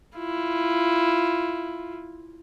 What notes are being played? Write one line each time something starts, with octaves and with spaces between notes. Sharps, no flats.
E4 F4